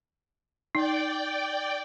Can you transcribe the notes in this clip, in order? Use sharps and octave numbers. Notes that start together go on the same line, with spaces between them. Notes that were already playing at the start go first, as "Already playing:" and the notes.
D#4 D5 G5